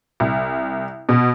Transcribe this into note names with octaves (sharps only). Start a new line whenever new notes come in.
C2
B2